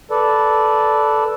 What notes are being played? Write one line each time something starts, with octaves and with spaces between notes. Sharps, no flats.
A4 B4 D5